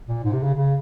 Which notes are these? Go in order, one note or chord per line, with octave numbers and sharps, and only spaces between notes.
A#2
G#2
C3
C#3
C#3